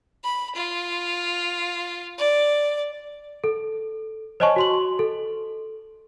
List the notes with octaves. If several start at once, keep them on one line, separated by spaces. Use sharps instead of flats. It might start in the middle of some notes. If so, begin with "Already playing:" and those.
B5
F4
D5
A4
C5 C#5 D#5 G#5 A5 C#6
F#4 C6 F#7
A4